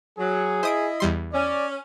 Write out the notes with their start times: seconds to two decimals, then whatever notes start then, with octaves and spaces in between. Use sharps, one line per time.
0.18 F#3 G#4
0.63 E4 C5 D#5 D#6 D7
1.00 E2 G3 C6
1.33 C#4 D5